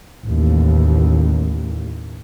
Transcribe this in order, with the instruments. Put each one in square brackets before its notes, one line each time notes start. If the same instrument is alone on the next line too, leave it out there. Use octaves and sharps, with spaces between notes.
[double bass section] A1 D#2